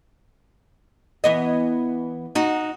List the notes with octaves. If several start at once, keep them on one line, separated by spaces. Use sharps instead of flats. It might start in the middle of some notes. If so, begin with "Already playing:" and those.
E3 B3 D#5
D#4 F#4